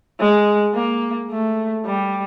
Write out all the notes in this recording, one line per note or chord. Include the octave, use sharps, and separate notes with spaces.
G#3
A#3
A3
G3